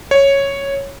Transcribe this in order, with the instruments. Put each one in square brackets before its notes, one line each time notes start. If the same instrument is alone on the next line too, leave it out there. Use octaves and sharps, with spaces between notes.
[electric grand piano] C#5